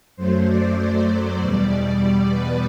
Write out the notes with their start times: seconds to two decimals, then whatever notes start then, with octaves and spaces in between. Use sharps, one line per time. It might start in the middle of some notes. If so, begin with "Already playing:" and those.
0.16 F#2 F#3 A3 C5
0.47 D5
1.39 E2 B2 G3
2.30 B4